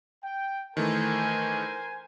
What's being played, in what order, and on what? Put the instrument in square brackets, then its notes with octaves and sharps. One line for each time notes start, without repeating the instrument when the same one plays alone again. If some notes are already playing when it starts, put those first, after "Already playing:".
[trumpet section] G5
[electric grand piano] D#3 E3 A3 [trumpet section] A#4 C5 G#5